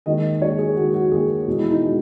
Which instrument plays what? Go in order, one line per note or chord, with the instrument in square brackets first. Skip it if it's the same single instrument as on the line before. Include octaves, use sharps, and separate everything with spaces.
[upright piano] D#2 D#3 G#3 D#5
D#2 D#3 G#3 C#5
G#4
D#2 D#3 G#3 F#4
F#4
D#2 D#3 G#3 G#4
E2 B2 G#3
E4
D#4
B2 G#3